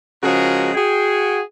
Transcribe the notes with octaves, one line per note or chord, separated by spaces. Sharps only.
C#3 F3 G#3 F#4 G#4 A#4
F#4 G#4 G5